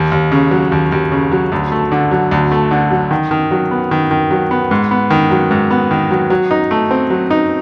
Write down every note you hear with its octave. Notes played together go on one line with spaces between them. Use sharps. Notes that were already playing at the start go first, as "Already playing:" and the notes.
Already playing: D#2
D#2
C#3
F#3
D#2
D#2
C#3
F#3
D2
A3
D3
F#3
D2
A3
D3
F#3
D#3
D#3
F#3
B3
D#3
D#3
F#3
B3
G#2
B3
D#3
F#3
G#2
B3
D#3
F#3
F#3
D#4
A3
C4
F#3
D#4